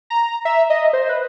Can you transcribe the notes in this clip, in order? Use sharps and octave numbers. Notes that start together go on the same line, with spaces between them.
A#5
E5
D#5
C5
B4